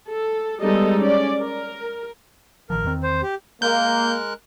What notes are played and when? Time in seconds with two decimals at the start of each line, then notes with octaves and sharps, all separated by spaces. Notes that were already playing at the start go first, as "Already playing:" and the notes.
0.10 A4
0.62 G3 G#3 B3 D#4 A4 D#5
0.99 C#4 D5
1.40 A#4
2.70 A1 D#3 F3 A#4
2.85 E2 D#3 C4
3.03 C5
3.23 G4
3.62 G#3 A#3 A#4 F#6 G6